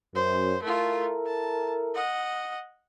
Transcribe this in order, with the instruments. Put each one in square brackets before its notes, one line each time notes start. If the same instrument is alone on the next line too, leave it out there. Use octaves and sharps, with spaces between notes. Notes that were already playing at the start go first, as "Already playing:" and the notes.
[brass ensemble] F#2 [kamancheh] C5
[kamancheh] A3 F4 [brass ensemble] E4 A4 A#4
[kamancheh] A5
D#5 F#5